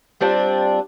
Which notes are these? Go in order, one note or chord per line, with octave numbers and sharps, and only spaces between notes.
G3 C4 D4 F4